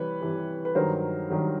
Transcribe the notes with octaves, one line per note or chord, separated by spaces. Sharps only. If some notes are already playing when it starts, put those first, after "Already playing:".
Already playing: C3 E3 G3 B4 C#5
C3 E3 G3
B4
G2 D#3 F#3 A#4 C5
G2 D#3 F#3